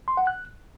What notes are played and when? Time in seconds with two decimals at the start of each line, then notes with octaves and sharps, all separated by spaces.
0.08 C6
0.17 F#5
0.27 F#6